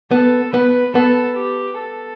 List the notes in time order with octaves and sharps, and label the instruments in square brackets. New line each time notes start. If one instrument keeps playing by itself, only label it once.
[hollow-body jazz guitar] B3 [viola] A4
[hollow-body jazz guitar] B3 [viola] B4
[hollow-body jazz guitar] B3 [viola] A4
[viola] G4
A4